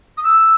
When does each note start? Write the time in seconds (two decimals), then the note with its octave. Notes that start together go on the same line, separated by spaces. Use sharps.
0.17 D#6
0.24 E6